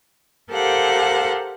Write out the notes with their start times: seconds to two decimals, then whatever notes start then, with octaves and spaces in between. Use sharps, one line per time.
0.51 G4 A4 A#4 C5 F5 F#5